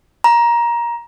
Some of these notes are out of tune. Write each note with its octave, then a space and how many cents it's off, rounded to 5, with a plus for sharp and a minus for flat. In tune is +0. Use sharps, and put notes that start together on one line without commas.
A#5 +20